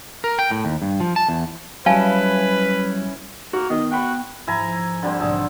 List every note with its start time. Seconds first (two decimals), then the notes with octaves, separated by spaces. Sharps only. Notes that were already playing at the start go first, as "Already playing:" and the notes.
0.24 A#4
0.39 G5
0.51 A2
0.65 D#2
0.82 G2
1.00 F3
1.16 A5
1.29 E2
1.86 F#3 G3 C#4 E4 B4 F5 G#5 A5
3.53 A#3 F#4
3.70 D#3 B3 D#5
3.92 F#4 G5 B5
4.47 G#2 F3 E4 G#5 A#5
5.02 D3 G3 C4
5.20 B1 G#2 D3 G#4 E5 A5